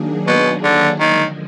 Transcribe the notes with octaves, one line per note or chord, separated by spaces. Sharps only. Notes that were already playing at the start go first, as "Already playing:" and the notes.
Already playing: D#3 F#3 A#3 D4 G#4
B2
D3
D3 D#3 F3 G#3